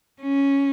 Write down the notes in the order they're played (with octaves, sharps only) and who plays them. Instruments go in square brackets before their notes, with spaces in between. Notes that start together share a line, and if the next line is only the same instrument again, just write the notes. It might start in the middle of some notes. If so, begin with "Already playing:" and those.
[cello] C#4